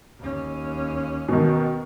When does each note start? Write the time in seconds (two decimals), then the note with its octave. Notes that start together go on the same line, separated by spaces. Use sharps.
0.20 D#2 C#4
1.28 B2 D#3